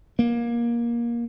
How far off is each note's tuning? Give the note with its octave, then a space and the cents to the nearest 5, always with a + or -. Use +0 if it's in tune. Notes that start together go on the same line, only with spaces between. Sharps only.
A#3 +20